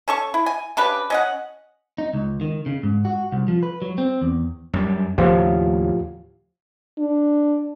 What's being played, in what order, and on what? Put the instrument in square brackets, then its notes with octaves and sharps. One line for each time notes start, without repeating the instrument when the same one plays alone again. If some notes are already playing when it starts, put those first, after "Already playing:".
[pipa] C#4 A4 C#6
E4
G#5
C#3 D4 G4 B4
C#4 D#5 F#5
[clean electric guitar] D#4
C#2
D#3
C#3
G#2
F#4
C2
F3
B4
F#3
C4
E2
[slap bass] F#2 G3
[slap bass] D#2 A2 C#3 [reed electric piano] F3 F4 G4
[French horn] D4